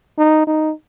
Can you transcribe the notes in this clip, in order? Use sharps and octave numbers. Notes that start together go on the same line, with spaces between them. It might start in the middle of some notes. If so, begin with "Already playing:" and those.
D#4
D#4